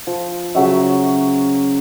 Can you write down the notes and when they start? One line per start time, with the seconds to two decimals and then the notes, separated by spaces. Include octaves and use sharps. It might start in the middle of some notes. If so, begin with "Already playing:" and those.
0.07 F3
0.55 C#3 F#3 E5